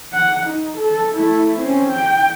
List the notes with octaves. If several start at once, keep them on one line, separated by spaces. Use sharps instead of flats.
F#5
D#4
A4
A3 E4
C4 C#4
G5